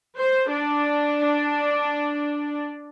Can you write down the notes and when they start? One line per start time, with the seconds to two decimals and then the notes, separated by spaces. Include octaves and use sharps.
0.18 C5
0.50 D4